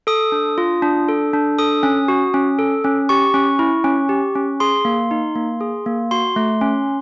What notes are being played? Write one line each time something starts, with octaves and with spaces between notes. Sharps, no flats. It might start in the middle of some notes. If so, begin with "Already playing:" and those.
A4 D#6
D4
F4
D4
A4
D4
A4 D#6
C#4
F#4
C#4
A4
C#4
G4 C#6
C#4
E4
C#4
G4
C#4
G#4 C6
A#3
D#4
A#3
G#4
A#3
F#4 C6
A3
C#4